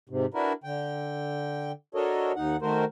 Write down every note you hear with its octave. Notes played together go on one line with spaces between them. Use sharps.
G#2 C3
D4 E4 F#4 A#4 B4
D3 G5
D4 F#4 A4 A#4 C#5 D#5
D#2 D#4 F#5
D#3 A3 F#4 A#4 C5